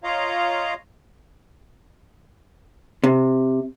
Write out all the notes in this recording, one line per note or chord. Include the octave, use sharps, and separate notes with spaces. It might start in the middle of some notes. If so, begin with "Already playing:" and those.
F4 C#5 D#5 F5 A#5
C3